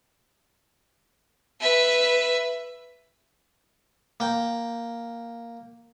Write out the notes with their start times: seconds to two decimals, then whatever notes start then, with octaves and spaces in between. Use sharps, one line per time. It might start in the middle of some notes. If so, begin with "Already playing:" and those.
1.60 B4 E5
4.20 A#3 G5